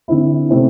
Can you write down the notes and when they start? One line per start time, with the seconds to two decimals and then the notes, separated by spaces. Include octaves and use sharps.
0.08 D3 C4 E4
0.49 C3 A3 C4 E4